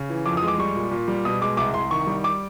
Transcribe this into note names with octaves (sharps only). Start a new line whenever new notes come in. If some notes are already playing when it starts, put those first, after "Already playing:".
Already playing: C#3
E3
F2 D6
D#6
G#3
D6
G3 C#6
A#2
A#2
G3
B2 D#6
G#3 D6
C2 D6
C2 C6
D#3 C#6
G3
D6